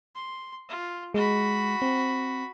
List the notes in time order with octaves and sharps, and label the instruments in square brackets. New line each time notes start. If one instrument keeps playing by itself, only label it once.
[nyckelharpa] C6
F4
[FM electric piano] G#3 [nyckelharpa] F#4 B5
[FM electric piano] C4